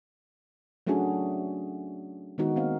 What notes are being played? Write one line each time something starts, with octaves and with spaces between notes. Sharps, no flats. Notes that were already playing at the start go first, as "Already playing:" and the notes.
F#3 A3 C#4 D4 F#4 G#4
D#3 G#3 B3 D#4 F#4
A#3 C4 F5